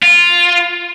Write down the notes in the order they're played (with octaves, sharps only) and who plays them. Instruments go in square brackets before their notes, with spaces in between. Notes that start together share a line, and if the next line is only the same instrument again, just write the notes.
[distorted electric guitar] F4